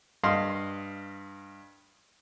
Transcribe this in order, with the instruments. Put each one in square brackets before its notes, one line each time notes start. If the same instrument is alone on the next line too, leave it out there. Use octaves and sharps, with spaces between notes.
[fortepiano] G2 D#5 F5 C6